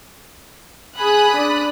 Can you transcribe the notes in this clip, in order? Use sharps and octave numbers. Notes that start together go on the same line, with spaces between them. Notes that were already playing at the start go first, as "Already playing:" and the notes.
G#4 G#5 B5 D#6 F#6
D4 D5